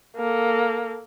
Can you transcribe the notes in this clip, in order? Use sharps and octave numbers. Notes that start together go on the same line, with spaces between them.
A#3 A4